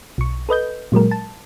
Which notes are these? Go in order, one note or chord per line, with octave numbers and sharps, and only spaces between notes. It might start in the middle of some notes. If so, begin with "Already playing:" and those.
B1 C#6
A4 B4 D#5 G6
A#2 F#3 G#3 A#4
A5